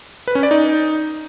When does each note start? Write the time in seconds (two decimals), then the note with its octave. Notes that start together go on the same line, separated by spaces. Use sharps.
0.28 B4
0.35 C#4
0.43 D5
0.51 D#4